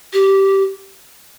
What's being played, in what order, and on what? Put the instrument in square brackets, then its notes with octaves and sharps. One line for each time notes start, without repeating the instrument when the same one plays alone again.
[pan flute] G4